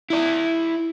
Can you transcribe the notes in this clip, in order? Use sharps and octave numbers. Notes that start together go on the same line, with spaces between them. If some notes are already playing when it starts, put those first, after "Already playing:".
E4 D5